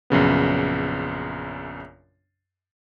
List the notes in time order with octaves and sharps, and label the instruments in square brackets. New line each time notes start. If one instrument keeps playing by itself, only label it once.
[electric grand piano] A#1 F#2 C#3 B3